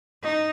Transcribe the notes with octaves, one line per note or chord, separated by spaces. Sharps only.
D#4